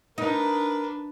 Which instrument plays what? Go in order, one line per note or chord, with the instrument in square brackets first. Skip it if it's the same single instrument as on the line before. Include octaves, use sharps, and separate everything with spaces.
[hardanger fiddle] D4 B4 [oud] D#4 [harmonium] A#4